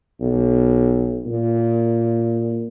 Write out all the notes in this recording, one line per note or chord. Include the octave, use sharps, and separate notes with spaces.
B1
A#2